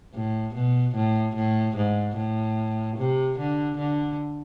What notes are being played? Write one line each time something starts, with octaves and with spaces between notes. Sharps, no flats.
A2
B2
A2
A2
G#2
A2
C3
D3
D3